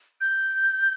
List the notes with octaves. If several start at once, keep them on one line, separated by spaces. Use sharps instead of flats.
G6